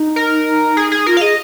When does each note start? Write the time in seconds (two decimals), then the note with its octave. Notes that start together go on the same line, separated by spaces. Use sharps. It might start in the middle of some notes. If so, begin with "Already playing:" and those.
Already playing: D#4
0.16 A#4
0.77 G#4
0.92 G#4
1.07 F4 A#4
1.17 F5
1.21 G#4 D#5